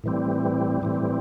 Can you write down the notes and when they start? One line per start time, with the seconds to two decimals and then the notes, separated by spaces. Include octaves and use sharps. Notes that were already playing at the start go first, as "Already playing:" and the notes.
0.04 A2 E3 G3 C4
0.82 A2 E3 G3 C4